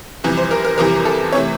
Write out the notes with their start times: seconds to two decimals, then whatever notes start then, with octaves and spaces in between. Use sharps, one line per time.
0.24 F2 C3 E3 G3
0.37 C5
0.51 A#4
0.65 A#4
0.78 F2 C3 E3 G3 A#4
1.05 A4
1.33 C3 E3 A3 C#5